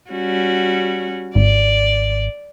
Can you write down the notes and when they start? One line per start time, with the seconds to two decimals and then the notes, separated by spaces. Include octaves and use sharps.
0.10 G3 C#4 F#4
1.35 G#1 D5